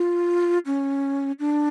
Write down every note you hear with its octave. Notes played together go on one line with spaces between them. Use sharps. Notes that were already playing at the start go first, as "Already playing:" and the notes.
Already playing: F4
C#4
D4